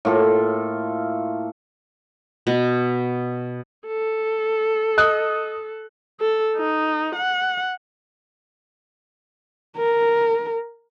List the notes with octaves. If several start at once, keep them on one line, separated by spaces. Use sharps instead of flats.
A2 A#3 F4 A4
B2
A4
D#5 D#6 F#6
A4
D#4
F#5
A#4